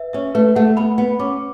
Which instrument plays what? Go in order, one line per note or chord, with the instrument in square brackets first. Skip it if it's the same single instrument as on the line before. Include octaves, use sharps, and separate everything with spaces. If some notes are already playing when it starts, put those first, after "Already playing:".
Already playing: [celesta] B4 E5
[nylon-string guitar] C#4 [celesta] E5
[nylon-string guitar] A3 [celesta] B4
[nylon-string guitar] A3 [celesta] F#5
[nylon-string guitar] B3 [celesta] B5
[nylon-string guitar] B3 [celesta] B5
[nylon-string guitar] C#4 [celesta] D6